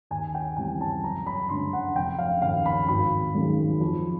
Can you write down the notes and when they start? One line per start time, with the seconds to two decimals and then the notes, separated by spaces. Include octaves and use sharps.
0.11 D#2 G#5
0.34 G5
0.56 C#3 E3 G3 C4 G#5
0.81 A5
1.03 F#1 A#5
1.26 B5
1.49 F#2 D3 C6
1.73 F#5
1.95 F1 G5
2.18 F5
2.42 D#2 C#3 F5
2.66 B5
2.88 G#1 B5
3.35 F#2 D#3 G#3
3.81 F2